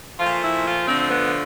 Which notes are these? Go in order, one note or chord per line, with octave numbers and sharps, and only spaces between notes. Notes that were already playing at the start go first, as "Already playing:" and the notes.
A#2 F3 A3 F4
E4
F4
D3 F3 A3 C4
B3